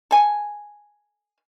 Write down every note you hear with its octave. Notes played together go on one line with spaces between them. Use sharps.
A4 G#5